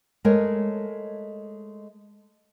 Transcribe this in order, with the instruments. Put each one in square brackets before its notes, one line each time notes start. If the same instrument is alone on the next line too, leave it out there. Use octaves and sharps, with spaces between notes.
[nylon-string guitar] G#3 A3 A#4 C#5